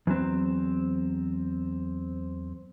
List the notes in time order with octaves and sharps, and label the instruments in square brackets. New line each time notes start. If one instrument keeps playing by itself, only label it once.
[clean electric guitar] E2 F#3 C4